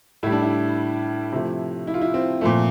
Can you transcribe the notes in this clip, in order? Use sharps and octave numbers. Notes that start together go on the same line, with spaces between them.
A2 G3 E4
D4
E4
C3 F3 A3
E4
F4
E4
C4
A#2 F3 A3